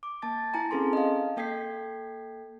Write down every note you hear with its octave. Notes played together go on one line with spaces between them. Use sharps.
D6
A#3 A5 A6
E4 G#5 A#5
C4 C#4 G#4 A4 A5 C6
D#5 F5
A#3 A4 G5 G#6 B6 C7